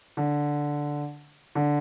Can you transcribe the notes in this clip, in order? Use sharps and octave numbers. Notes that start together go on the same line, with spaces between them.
D3
D3